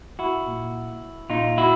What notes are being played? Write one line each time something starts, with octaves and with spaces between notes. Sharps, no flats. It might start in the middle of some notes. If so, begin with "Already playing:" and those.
E4 F#4
A#2
A#2 D#4 F4
E4 F#4